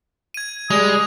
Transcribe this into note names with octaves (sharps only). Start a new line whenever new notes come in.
G#6 D#7
G3 G#3 D#6 F7